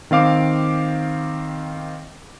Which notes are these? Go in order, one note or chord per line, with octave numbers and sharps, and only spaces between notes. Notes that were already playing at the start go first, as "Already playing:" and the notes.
D#3 C4 F5 D6